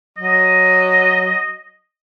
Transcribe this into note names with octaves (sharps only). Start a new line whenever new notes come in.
F#3 D#5